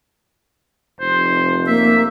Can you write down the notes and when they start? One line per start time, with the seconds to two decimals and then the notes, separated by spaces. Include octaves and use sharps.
1.00 F1 C5
1.67 A#3 E5